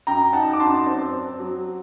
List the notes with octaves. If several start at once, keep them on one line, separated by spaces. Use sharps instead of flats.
F#2 G5 A#5
D#4 F#5 A5
D6
F#2 A5 C6
C4
C4
F#3